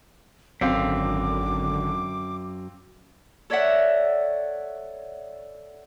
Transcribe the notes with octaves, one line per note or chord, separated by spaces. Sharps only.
G#1 F#2 D3 C4 F5 D6
A4 C#5 D5 E5 F#5